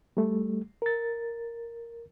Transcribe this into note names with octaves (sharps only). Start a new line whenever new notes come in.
G3 A3
A#4 A6